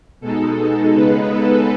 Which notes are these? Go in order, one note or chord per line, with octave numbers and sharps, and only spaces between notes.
B2 G#3 D#4 A4
C#3 G#3 B3 D#4 B4
A4